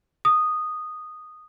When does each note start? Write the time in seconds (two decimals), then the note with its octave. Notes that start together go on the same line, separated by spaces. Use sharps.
0.25 D#6